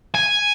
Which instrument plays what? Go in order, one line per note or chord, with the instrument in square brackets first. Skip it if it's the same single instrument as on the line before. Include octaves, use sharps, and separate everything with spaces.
[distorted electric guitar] G#5